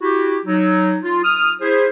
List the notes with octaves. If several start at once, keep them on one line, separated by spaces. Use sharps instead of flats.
E4 F#4 G4
F#3 D#4
F4
D#6 F6
E4 G#4 C5